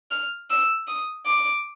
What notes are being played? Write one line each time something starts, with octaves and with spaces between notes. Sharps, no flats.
F6
E6
D#6
D6